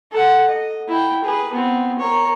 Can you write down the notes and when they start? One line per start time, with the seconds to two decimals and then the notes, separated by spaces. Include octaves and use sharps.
0.11 A4 F#5
0.49 D#5
0.88 E4 G5
1.23 G#4 B4
1.53 B3 C4
1.99 A#4 C#5